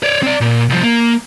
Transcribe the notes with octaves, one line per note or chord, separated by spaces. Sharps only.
C#5 D5
C4 D5
A#2
C2 F3
A#3